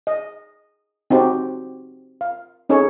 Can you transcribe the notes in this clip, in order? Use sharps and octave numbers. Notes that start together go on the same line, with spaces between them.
D#5
C4 D#4 F#4 G4
F5
C#4 D#4 G#4 A4 C#5